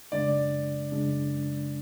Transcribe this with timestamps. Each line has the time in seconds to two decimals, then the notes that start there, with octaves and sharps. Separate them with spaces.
0.12 F#2 C#3 G#3 D4 D5
0.92 F#2 C#3 G#3 D4